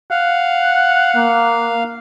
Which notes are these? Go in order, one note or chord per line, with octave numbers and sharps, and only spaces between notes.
F5 F#5
A#3